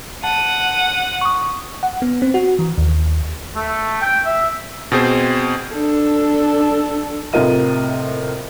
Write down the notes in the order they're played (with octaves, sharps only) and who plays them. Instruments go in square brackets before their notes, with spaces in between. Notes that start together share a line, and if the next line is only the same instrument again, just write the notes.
[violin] F#5 D#7 [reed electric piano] A5
[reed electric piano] C#6 D#6
[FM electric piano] F#5
B3
C4
F#4
E3
D#2
[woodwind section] A3
G5
E5
[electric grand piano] B2 C4 G#4 C5
[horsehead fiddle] D4 A4
[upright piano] A2 C3 F4 A#4 D#5 D#7